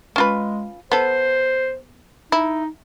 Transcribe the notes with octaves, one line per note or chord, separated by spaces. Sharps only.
G#3 C#4 F4 B4
B3 A4 C5
D#4 E4